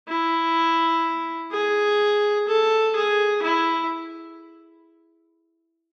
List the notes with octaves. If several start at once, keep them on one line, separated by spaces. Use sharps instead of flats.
E4
G#4
A4
G#4
E4